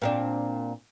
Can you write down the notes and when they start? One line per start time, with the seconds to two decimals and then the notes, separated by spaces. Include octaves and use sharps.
0.02 A#2 C4 D4